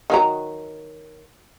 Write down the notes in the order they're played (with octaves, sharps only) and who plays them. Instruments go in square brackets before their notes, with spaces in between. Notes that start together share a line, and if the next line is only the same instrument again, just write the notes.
[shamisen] D#3 F#3 A#5